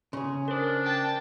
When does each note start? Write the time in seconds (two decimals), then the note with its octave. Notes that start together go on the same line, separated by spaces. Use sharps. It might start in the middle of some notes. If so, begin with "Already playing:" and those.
0.13 C#3 G#4 C6
0.48 D4 A#4 C5
0.84 G5 A5